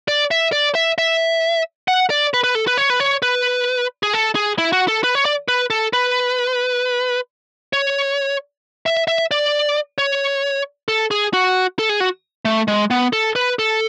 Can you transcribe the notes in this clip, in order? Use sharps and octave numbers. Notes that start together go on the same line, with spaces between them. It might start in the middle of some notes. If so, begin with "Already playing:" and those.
D5
E5
D5
E5
E5
F#5
D5
B4
B4
A4
B4
C#5
B4
C#5
B4
G#4
A4
G#4
E4
F#4
A4
B4
C#5
D5
B4
A4
B4
C#5
E5
E5
D5
C#5
A4
G#4
F#4
A4
G#4
F#4
A3
G#3
B3
A4
B4
A4